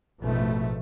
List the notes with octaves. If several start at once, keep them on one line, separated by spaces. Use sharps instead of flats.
A1 F2 G#2 B2 F3 A3